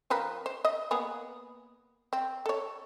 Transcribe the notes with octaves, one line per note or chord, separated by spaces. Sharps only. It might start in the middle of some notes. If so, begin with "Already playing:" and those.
F3 A#4 B4
C5
D#5
A#3 B3 G#4
C4
A4 C#5